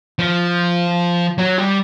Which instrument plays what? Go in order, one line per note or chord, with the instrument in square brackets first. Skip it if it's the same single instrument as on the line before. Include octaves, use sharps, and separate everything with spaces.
[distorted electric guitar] F3
F#3
G3